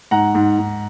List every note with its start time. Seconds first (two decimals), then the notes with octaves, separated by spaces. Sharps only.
0.11 G#2 F#5 A#5
0.35 G#2
0.59 G#2